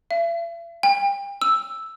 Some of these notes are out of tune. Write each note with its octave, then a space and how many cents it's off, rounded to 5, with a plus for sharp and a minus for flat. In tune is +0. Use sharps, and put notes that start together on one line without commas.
E5 +45
G5 +35
E6 +0